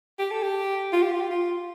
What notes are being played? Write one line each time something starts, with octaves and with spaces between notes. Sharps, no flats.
G4
A4
G4
F4
G4
F4
G4
F4